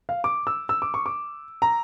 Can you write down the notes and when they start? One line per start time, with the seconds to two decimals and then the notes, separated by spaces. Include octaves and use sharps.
0.09 F5
0.24 D6
0.47 E6
0.69 E6
0.82 D6
0.94 C#6
1.06 D6
1.62 A#5